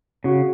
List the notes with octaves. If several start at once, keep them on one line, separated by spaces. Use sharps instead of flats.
C#3 F#4